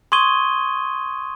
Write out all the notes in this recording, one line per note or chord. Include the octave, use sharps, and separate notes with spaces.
C6 C#6 D#6 G#6 D#7 G7